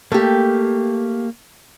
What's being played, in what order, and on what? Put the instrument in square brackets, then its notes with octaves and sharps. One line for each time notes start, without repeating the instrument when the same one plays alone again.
[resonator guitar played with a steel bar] A3 G4 [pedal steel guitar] A#3